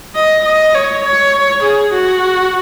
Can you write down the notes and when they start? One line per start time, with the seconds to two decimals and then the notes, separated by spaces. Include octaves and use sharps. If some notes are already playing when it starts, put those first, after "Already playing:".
0.15 D#5
0.45 D#5
0.75 C#5
1.04 C#5
1.63 G#4
1.94 F#4